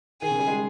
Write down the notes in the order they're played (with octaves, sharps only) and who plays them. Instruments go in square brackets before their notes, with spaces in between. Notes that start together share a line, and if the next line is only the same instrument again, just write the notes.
[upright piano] D#3 [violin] G#4
[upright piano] C#3
G3
G#3